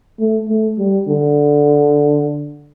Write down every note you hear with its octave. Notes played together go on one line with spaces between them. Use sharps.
A3
A3
G3
D3